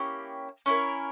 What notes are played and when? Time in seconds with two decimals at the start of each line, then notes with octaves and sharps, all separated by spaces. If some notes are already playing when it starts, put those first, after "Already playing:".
Already playing: A#3 C#4 E4 G4
0.66 C#4 E4 A#4